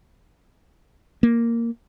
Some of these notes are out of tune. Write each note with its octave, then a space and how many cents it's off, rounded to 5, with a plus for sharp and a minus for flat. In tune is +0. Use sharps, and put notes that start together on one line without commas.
A#3 -5